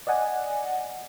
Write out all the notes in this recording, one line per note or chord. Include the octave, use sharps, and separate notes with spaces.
D5 D#5 F#5 G#5